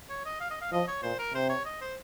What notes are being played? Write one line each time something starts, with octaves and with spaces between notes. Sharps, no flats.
C#5
D#5
F5
D#5
F5
F3 D#5
C#5
A#2 C5
A#4
C3 C5
C#5
D#5
C5